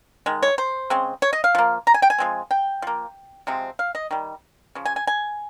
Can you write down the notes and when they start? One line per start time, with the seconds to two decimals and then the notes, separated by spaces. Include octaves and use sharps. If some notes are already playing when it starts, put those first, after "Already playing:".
0.26 D#3 G#3
0.43 C#5
0.58 C5
0.90 C#3 G#3 C4
1.22 C#5
1.33 D#5
1.44 F5
1.55 F3 A#3
1.87 A#5
1.94 G#5
2.02 G5
2.10 G#5
2.18 F3 G#3 C4
2.51 G5
2.82 F3 A#3
3.47 C3 F3 G#3 C4
3.79 F5
3.95 D#5
4.11 D#3 G3
4.75 C#3 F3
4.85 G#5
4.96 G#5
5.07 G#5